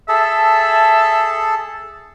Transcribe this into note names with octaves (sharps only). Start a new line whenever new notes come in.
G#4 A4 E5 A5